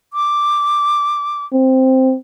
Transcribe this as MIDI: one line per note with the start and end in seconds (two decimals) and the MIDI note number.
0.13 1.45 86
1.53 2.16 60